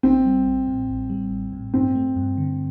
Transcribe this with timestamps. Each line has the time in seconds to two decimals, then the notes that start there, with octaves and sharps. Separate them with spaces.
0.03 A1 C4
0.25 G3
0.46 A1
0.67 A2
0.89 A1
1.10 G3
1.31 A1
1.52 A2
1.74 G2 C4
1.95 A3
2.16 G2
2.38 D3